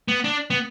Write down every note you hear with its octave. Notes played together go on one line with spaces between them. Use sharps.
B3
D4
B3